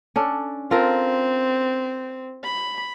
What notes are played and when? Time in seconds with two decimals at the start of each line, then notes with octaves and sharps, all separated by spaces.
0.16 C#4 D4 A4
0.71 C4 F4 A4 A#4
2.44 B5